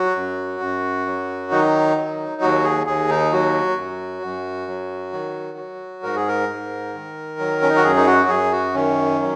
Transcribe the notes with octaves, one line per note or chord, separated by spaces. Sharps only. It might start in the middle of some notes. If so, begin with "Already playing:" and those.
Already playing: F#3 F#4
F#2
F#2
F#3
D#3 D#4
F#3
D#2 F#4
G#4
D#2 G#4
D#4
F#3 F#4
F#2
F#2
F#3
D#3
F#3
G#2 A#4
G#4
A#4
G#2
D#3
F#3
C#4
D#4
F#4
F#2 G#4
D#4
F#4
F#2 G#4
F#4
D#3 C#4
F#3